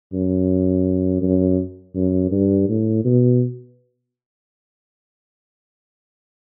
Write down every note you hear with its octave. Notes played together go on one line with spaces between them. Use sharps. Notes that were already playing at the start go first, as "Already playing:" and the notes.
F#2
F#2
F#2
G2
A2
B2